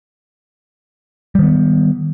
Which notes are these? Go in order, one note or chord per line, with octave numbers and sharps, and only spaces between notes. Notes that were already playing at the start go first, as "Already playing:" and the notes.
D#3 G3 B3